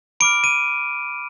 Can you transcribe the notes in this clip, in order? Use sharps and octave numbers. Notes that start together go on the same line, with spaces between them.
B5 D6 F6 D7
D#7